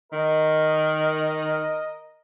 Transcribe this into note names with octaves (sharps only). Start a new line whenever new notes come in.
D#3 A#4 D#5